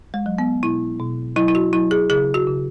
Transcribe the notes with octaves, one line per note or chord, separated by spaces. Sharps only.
G#3
F#3
B3
B2 E4
B2
F#3 E4
E4
F#4
F#3 E4
G#4
C#3 G#4
F#4
C#3